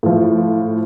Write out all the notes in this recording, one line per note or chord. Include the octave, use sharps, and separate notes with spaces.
A2 F3